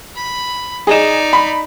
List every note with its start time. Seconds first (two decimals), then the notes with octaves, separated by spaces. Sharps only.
0.16 B5
0.87 D#4 G#4 D5 D#5 E7
1.33 B5